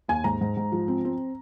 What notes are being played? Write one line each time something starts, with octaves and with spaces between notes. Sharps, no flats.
D#2 G#5
G#2 A#5
G#2
G#2
F3
C4
C4